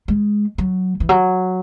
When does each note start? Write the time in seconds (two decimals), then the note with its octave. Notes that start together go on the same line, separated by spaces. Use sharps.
0.08 G#3
0.58 F#3
1.00 E3
1.09 F#3